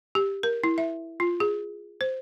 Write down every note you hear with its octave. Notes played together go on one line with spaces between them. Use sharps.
G4
A#4
E4
E5
F4
G#4
C5